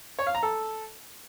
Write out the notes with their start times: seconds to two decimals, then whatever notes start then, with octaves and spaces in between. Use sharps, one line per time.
0.19 C#5
0.27 F5
0.35 A#5
0.43 A4